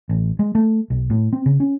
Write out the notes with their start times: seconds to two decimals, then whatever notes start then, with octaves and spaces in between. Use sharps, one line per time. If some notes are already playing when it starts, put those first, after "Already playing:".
0.09 A1
0.39 G#3
0.55 A3
0.90 B1
1.10 A2
1.33 C4
1.46 C#3
1.60 C#4